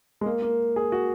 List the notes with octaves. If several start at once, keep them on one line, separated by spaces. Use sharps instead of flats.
G#3
A#3
A#3
G#4
F#4